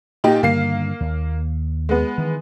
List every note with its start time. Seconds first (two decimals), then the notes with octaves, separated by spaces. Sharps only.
0.24 A#2 D#4 G4
0.43 G2 D3 D#3 A#3 F5 C7
1.01 D#2
1.89 G#3 B3
2.18 D#3 E3